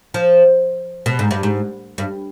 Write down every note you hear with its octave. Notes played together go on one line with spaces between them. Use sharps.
F3
B2
G#2
G2
G#2
G2